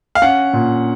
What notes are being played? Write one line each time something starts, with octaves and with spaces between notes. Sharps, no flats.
F5
C#4 F#5
A#2